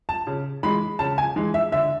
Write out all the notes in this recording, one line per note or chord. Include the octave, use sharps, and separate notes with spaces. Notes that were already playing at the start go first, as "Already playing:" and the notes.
A5
C#3
E3 G#3 B5
C#3 A5
G#5
E3 G#3
E5
D3 E5